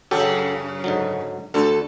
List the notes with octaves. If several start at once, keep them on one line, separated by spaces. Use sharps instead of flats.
F#2 C#3 F#3 C#4 G4 A4
G#2 D3 F#3
D2 D3 A4